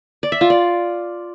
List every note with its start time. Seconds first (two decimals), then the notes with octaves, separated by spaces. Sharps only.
0.23 D5
0.32 E5
0.41 F4
0.50 D5